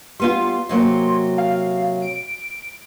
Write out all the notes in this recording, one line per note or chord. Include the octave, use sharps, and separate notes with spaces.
G3 B3 F4 C6
C3 F#3 A#3
F5
D7